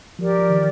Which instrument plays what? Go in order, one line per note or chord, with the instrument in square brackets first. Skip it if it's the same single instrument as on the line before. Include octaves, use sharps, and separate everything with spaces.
[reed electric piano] F3 [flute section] G4 A#4 D5
[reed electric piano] F3
D#3